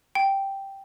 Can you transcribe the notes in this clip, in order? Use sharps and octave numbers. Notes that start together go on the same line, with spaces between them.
G5